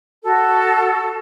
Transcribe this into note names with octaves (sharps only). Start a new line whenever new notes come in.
F#4 A4